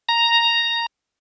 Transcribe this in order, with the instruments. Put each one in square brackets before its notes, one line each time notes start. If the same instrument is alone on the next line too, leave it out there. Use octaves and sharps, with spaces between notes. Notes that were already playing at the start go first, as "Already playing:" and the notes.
[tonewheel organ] A#5